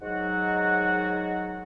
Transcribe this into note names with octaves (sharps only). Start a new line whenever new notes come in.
G#2 D#3 F#3 F#4 F#5